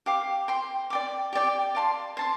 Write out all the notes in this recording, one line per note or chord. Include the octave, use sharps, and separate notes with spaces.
G4 F5 D6
C5 G5 C6
D5 G5 D6
G4 D5 G5
D5 F5 A5 C6
C5 A5 C6